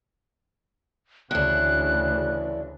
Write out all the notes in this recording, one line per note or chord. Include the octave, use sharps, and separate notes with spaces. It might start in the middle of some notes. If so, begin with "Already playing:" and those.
D2 C#3 E3 D4 F#6